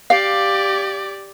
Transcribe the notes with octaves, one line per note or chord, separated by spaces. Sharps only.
G4 D5 F5